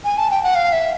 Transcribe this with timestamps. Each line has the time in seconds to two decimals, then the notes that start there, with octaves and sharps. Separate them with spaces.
0.04 G#5
0.18 A5
0.31 G5
0.43 F#5
0.55 F5
0.73 E5